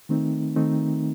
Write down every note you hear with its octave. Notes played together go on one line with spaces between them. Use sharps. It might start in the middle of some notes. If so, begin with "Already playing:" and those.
D#3 A3 C4 D#4
D#3 A3 C4 D#4